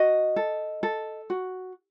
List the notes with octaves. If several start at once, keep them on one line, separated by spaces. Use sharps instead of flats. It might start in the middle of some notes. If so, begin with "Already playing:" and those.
Already playing: F#4 D#5
A4
A4
F#4